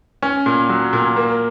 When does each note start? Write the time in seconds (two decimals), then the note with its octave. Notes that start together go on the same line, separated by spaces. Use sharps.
0.23 C#4
0.46 A#2
0.69 F#3
0.93 A#2
1.16 A#3